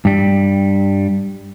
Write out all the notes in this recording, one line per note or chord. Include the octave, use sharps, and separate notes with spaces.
G2 G3